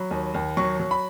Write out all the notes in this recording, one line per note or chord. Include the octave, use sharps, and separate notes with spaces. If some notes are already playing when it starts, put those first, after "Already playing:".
Already playing: F#3 B5
D#2
D#2
F#3 C#6
F#3
B5